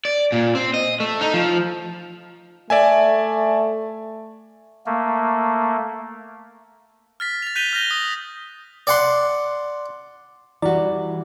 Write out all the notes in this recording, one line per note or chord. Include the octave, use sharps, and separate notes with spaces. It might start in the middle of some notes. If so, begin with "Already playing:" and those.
D5
A#2
C4
D#5
A3
D#4
F3
A3 D5 E5 G#5
A3 A#3
F6 A6 B6
A6 F7
F#6 G6 B6 D#7 F7 G7
F6 G6 A#6 G7
D#6
D5 F#5 C6
E3 G3 E4 F#4 D5